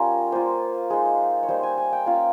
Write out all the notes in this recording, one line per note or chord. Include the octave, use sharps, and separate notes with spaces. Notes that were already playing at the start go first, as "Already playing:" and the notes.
Already playing: G3 C#4 F4 A#4
A#3 F4 C5
G#3 D#4 G#4
C#5
G3 A#3 D#4 C5
G#5
G#5
G5
A#3 C#4 F4 F5